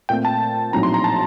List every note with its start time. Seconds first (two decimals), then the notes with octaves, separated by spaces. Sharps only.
0.09 A#2 A3 C4 G5
0.25 A5
0.73 A#1 A2 F#3 C4 D#4 A#5
0.83 C6
0.94 A#5
1.04 A5